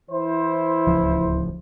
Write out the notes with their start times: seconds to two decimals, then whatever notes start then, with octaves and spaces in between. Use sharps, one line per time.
0.11 E3 E4 C5
0.87 D1 C#2 F3